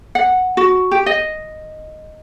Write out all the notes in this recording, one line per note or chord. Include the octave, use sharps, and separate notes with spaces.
F#5
F#4
G4
D#5